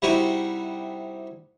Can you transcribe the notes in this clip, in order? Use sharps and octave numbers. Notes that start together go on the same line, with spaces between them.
C3 G3 D#4 E4 F#4